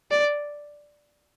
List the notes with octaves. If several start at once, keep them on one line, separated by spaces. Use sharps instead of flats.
D5